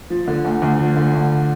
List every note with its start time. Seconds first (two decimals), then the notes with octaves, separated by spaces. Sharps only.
0.10 F3
0.28 D3
0.45 D2
0.62 D2
0.79 F3
0.96 D3
1.14 D2